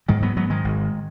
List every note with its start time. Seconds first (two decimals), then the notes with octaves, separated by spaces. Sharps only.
0.08 G#2 D#3 G#3
0.22 F#3 B3
0.37 G#2 F#3 B3
0.50 D#3 G#3
0.64 G#1